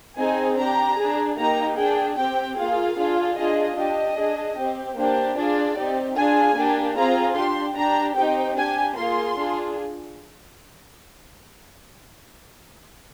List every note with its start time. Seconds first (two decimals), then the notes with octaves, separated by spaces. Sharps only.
0.18 C4 D#4 G#4 G#5
0.57 D4 G4 A#5
0.98 D4 G#4
1.37 A#3 D#4 G4 A#5
1.77 D4 G#4 G5
2.17 C4 G4 G5
2.57 A#3 F4 G#4 F5
2.97 D4 F4 G#4
3.37 D4 F4 G#4 D#5
3.77 D4 G4 D#5
4.17 D4 G#4
4.57 C4 G4
4.96 A#3 D4 G4 C5
5.36 D4 F4 G#4 D5
5.77 C4 D#4 G4
6.17 D4 F4 G#4 G#5
6.56 A#3 D4 G4
6.96 C4 F4 G#4 A#5
7.36 D4 G4 C6
7.76 D4 G4 A#5
8.16 C4 D#4 G4 G5
8.56 D4 G4 G#5
8.96 A#3 F4 G#4 C6
9.36 D4 F4 G#4